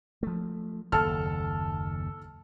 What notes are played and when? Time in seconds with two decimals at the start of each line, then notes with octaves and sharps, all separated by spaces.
0.23 F3 A3
0.92 F#1 D#2 A4 A5 F6